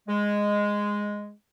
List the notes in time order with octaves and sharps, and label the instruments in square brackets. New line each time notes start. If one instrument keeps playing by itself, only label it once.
[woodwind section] G#3